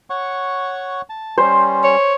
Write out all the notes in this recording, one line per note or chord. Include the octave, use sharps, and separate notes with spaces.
C#5 F#5 C#6
A5
G3 C#4 C5
C#5